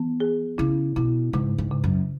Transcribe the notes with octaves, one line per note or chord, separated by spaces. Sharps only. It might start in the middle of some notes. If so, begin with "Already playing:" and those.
Already playing: E3 B3
G#4
C#3 E4
B2 E4
G#2 C#3
G#2
C#3
F#2